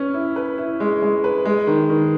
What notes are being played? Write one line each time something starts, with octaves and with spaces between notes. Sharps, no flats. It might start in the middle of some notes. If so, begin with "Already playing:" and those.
Already playing: C#4 B4
E4
B4
E4
G#3
G#3
B4
G#3
D#3
D#3